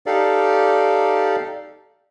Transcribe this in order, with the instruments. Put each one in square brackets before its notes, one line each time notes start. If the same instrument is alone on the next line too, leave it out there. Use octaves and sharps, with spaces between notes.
[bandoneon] D#4 G4 A4 D5 F5